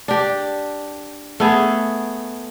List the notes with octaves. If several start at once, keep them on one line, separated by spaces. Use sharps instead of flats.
D4 G4
A3 B3 G#4